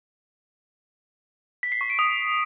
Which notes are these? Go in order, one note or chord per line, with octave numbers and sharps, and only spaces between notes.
B6
C7
C#6
D7
D#6